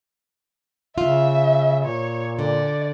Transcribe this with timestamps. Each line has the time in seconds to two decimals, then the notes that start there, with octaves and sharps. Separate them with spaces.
0.98 C#3 F4 E5
1.85 A#2 C#5
2.39 D3 D5